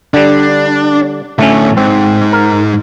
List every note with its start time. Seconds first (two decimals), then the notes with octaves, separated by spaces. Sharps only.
0.14 D3 G3 D4
1.39 D2 A2 A3 C#4
1.77 G#2 C4
2.33 A#4